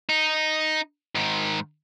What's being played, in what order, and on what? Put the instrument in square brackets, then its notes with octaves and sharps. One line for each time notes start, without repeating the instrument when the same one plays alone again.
[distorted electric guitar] D#4
G#2 D#3